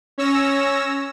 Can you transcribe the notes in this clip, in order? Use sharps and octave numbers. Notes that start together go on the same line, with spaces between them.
C#4 C#5 E6 A#6